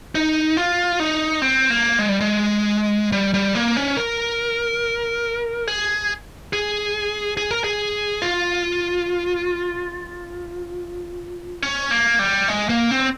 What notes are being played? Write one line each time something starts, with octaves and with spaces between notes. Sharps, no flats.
D#4
F4
D#4
C4
A#3
G#3
G3
G#3
G3
G3
A#3
C#4
A#4
G#4
G#4
G#4
A#4
G#4
F4
C#4
A#3
G3
G#3
A#3
C4